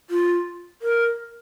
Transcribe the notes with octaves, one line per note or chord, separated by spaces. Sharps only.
F4
A#4